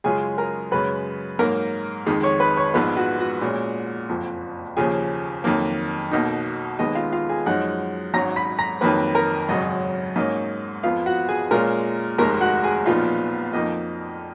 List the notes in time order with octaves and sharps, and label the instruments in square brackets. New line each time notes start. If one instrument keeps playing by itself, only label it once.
[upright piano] F#2 C#3 G#3 C#4 F4 G#4 G#5
A#4 A#5
F#2 C#3 G#3 B4 B5
G#2 F#3 A#3 A#4 A#5
F2 D#3 G#3
C#5 C#6
B4 B5
C#5 C#6
A#1 G#2 F3 G#3 B3 B4 B5
F#4 F#5
F#4 F#5
A#2 G#3 C#4
F#1 F2 F3
D#2 C#3 F3 G#4 G#5
F2 D#3 F#3 A#3
B1 B2 A#3 D#4
D#2 D#3 G#3 B3 D#5
F4 F5
F4 F5
G#4 G#5
F#2 F3 G#3 D#4 F#5 F#6
G#1 G#2 F#3 C#4 A#5 A#6
B5 B6
A#5 A#6
F2 D#3 F#3 A#3 B4 B5
A#4 A#5
G#1 F#2 C#3 F#3 C#4 D#5
G#2 F#3 A#3 C#4 D#5
F2 F3 B3 F4 F5
F#4 F#5
G#4 G#5
A#2 G#3 C#4 F4 A#4 A#5
F1 D#2 D#3 G#3 A#4 A#5
F#4 F#5
G#4 G#5
B1 A#2 F3 B3 D#4 F4 F5
F2 F3 A#3 D#4 D#5